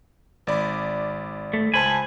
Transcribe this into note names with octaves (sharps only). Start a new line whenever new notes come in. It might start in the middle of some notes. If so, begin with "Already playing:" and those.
G#1 D5 B5
A3
C#2 C5 G#5 A5 B5